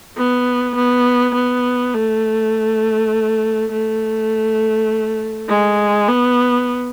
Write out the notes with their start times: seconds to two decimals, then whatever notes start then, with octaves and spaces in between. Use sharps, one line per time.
0.17 B3
0.76 B3
1.35 B3
1.94 A3
3.72 A3
5.49 G#3
6.08 B3